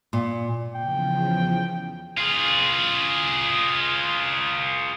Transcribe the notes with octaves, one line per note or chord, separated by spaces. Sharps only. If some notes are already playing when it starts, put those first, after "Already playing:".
A#2
E2 C#3 F3 G5
F4 G#4